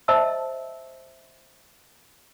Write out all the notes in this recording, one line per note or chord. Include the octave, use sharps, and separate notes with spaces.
C5 D#5 E5 A5 E6